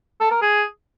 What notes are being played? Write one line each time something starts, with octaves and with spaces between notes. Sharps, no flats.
A4
A#4
G#4